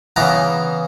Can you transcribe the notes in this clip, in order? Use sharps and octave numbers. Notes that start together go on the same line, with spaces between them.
C#3 E3 B3 A#5